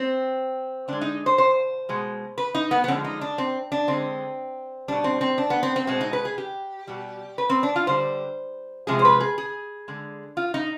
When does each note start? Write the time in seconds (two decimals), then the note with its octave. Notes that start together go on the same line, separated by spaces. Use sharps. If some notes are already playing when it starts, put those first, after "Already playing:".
Already playing: C4
0.88 D3 G#3 D4
1.01 D#4
1.26 C5
1.38 C5
1.89 B2 G#3
2.38 B4
2.55 D#4
2.71 B3
2.84 B3
2.88 D3 F3 G#3 C4
3.04 D#4
3.21 D4
3.38 C4
3.72 D4
3.88 D3 G#3 C4
4.88 B2 G3 D4
5.04 C4
5.21 C4
5.38 D4
5.50 B3
5.63 C4
5.76 C4
5.87 B2 G#3 C4
6.01 D#4
6.13 B4
6.25 G#4
6.38 G4
6.87 B2 G3
7.38 B4
7.50 C4
7.63 D4
7.76 F4
7.87 D3 G3 C5
8.87 C3 F3 G#3 G#4
8.99 C5
9.05 B4
9.20 G#4
9.38 G#4
9.88 D3 G#3
10.37 F4
10.54 D#4